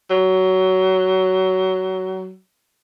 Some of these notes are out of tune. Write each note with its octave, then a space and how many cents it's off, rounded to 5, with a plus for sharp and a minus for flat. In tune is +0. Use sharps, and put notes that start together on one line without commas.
F#3 +20